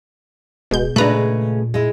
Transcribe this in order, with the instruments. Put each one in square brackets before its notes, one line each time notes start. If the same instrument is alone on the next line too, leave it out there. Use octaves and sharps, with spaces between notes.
[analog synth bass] D1 [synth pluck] B2 G#3 G6
[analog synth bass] A#2 [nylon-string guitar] C#3 G#3 [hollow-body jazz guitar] A3 B4 [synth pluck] D4 A#5 F#6
[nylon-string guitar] G#3 E4